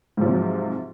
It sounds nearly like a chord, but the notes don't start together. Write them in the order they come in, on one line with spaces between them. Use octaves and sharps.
G#2 F3 C3 F#3